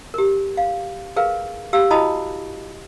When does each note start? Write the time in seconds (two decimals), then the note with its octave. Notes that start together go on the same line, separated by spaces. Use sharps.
0.14 G4 A#4
0.57 F5
1.16 G#4 A#4 B4 F5
1.73 G4 F5 E6
1.90 E4 F#4 D#5 A5 B5 D#6